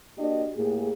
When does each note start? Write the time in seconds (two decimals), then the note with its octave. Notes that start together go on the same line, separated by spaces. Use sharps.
0.18 A#3 D4 F#4 G4 D5 D#5
0.55 A2 A#3 G4 G#4